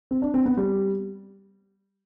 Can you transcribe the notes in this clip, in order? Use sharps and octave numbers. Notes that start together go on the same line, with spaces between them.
C4
D4
C4
B3
G3